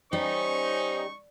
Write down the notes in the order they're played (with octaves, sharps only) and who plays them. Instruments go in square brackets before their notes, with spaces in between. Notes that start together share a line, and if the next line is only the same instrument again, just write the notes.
[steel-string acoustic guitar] G3 [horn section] C#4 D#4 [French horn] C5 [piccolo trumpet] C#6